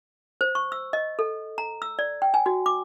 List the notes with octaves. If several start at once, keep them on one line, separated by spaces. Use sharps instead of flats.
C5
C#6
E6
D#5
A4
A#5
E6
D5
G5
G#5
F#4
D6